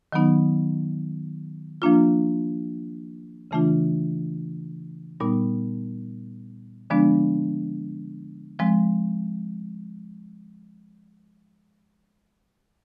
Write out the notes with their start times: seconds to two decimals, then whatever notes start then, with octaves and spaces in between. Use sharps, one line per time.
0.12 D#3 F#3 B3 D#4
1.82 F3 A#3 D4 F4
3.51 C#3 E3 A3 D4 F4
5.20 A#2 G3 B3 D#4
6.90 D3 F3 G#3 B3 D4
8.59 F3 G#3 C4